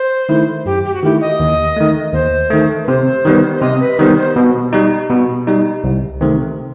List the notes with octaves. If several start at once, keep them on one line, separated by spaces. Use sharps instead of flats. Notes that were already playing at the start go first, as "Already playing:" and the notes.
Already playing: C5
D#3 A3 E4
F#2 G4
G4
F#4
D#3 A3 E4 G4
D#5
D#2
D#3 A3
D#2 C5
D#3 A3
B4
C3 C5
D#3 G3 B3
C5
C3 D#5
B4
B4
D#3 G3 B3 C5
C5
B2
G3 D#4
B2
G3 D#4
C2
C3 D#3 A3 C4